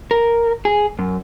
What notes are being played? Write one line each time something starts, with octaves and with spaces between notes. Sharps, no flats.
A#4
G#4
F#2